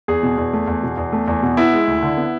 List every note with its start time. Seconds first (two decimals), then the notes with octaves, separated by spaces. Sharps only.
0.08 E2 G#4
0.23 B2
0.38 E2
0.53 A3
0.67 E2
0.83 B2
0.97 E2
1.13 A3
1.28 E2
1.43 B2
1.57 B3 E4
1.73 G#3
1.87 D2
2.03 D3
2.17 B3